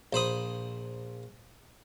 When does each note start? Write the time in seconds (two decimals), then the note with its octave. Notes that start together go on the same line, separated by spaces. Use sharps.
0.13 A#1 C5 B5 D#6